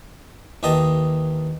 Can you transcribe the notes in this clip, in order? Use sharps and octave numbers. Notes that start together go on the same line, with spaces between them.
D#2 E3 G4 D#5 A5